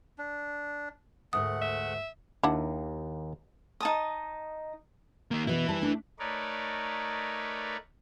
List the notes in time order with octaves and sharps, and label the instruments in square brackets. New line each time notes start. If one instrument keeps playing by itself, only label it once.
[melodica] D4
[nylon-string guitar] D2 G#2 A#4 [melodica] A3 F#5 [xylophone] D#6
[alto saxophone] E5
[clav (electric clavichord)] D#2 [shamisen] D4 E4 F#5
[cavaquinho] D#4 A5 D#6
[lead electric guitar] D#3 A#3
[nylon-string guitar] B2 E3 B3 [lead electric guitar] E4 B4
[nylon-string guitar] G3 C5 A5
A3 D4
[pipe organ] A3 D#4 A#4 B4 C#5 D5